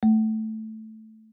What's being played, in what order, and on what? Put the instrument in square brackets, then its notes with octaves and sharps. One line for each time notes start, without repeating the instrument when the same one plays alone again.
[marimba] A3